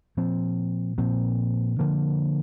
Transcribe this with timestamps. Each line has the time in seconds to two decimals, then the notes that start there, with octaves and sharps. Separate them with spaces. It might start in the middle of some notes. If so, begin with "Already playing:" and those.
0.17 A#2 F3 C4
0.98 A#2 F3 C4
1.79 D3 F3 A#3